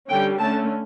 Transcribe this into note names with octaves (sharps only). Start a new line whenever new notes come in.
D3 G3 C#4 G5
D3 A3 C#4 A5